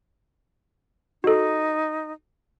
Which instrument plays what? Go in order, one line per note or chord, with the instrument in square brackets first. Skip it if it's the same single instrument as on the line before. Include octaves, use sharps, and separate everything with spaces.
[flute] D#4 [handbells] F#4 A4